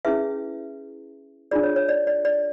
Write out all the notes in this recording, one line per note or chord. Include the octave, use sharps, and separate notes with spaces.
C#4 E4 G#4 B4 E5
D4 F4 G#4 D5
C#5
C#5
D5
D5
D5